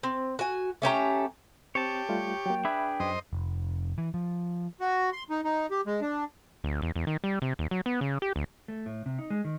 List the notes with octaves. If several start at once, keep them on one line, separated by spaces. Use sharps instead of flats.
C4
F#4 G#5
A3 C#4 G4 A#5
C4 G4 C#5 A5
G3 A3 F4
F#3 A#3 G5
D4 G#4 B4 E5 B5 G#6
F#2 C5 D#5
F1
E3
F3
F#4
C6
D#4
D#4
G4
G#3
D4
D2
E2
E2
D#3
G3
C3
D#2
F#3
B3
C#3
G4
D2
A3
A2
C3
D#4
G#3
D#3